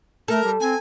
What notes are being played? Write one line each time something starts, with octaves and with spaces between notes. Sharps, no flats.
A3 A4 A#4
G3
C4 G#5